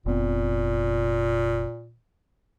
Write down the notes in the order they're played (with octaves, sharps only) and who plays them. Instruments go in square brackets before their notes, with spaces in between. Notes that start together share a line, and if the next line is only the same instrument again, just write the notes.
[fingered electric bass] F1 B3 C4 [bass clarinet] A#2